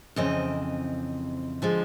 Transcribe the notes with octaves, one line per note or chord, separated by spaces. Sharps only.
F2 C#3 E3 C4 D#5
D3 F3 G#3